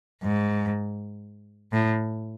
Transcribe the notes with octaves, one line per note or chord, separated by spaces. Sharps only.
G#2
A2